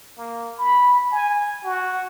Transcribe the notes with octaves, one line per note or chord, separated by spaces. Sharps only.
A#3
B5
G#5
F#4